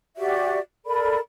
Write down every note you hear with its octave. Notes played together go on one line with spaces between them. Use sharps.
F#4 G4 D5 E5
A4 A#4 D5 B5